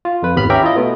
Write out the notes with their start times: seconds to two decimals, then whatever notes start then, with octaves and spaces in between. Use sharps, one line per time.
0.05 F4
0.22 F2 B4
0.36 G#1 D#2 B3 B5 F6
0.50 C#4 G4 E5 G5 A#5
0.63 E4 F4 D#5
0.76 B2 A3 B3